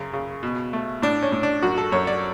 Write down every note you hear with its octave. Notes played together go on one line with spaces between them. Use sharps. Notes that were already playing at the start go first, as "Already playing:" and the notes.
Already playing: F#2 C#3
C#3
B2
A3
A2 D4
C#4
A2
D4
F#2 F#4
A4
F#2 C#5
D5